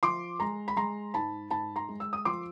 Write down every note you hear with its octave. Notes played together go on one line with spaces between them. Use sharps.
F3 C6 D6
G#3 A#5 C6
B5
G#3 A#5 C6
G#2 A5 B5
G#2 A5 B5
A#5 C6
G#3
E6
D#6
F3 C6 D6